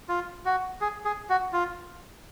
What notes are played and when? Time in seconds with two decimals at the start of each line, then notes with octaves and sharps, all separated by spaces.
0.09 F4
0.45 F#4
0.81 G#4
1.05 G#4
1.29 F#4
1.53 F4